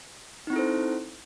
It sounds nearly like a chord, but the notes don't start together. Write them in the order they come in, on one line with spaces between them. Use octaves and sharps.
D#4 C4 E4 A4 C5